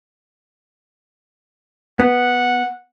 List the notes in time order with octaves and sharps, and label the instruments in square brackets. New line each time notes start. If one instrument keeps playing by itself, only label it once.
[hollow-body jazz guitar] B3 [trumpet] F#5